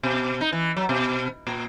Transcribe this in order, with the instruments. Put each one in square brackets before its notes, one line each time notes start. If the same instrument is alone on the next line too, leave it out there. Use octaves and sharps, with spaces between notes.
[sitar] B2
D#4
E3
F#3
B2
A#2